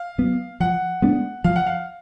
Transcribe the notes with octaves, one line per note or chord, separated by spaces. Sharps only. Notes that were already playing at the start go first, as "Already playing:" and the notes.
Already playing: F5
F#3 B3
F3 F#5
G#3 B3 D4
F3 F5
F#5
F5